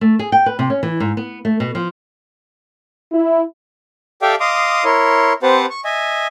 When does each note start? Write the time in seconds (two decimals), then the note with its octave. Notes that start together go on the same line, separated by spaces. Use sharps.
0.01 A3
0.19 G#4
0.32 G5
0.46 B4
0.59 C3
0.70 C#4
0.83 E3
1.00 G#2
1.17 B3
1.45 A3
1.60 B2
1.75 F3
3.12 E4
4.22 G4 A4 D5 E5 F5 G5
4.40 D#5 F5 C6 D6 D#6
4.85 E4 A#4 C#5 C6
5.43 C4 G4 B4 C5 F#5 A5
5.70 C#6
5.85 D#5 E5 G#5